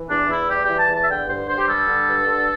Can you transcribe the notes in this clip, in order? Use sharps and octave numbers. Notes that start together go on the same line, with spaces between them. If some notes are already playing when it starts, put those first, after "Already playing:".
Already playing: E3
E2 D4
E2 E4
G3 G4
E3 G4
A5
E2
A5
E5
D3 G5
G2 C5
G2 C5
G4
G3 A4
D3
G2
D3